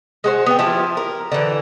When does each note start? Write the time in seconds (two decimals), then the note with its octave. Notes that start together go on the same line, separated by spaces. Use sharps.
0.24 G#3 F#4 C5
0.46 B3 G5
0.59 F3 E4 F4 G4
0.97 A#4
1.32 D3 E3